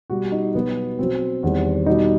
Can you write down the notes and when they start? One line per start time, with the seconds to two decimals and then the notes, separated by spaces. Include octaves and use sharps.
0.10 B2 G3 F#4
0.32 D#4
0.55 B2 F#3 B3
0.99 B2 F#3 C4
1.43 E2 D#3 G3
1.86 B2 G3 D#4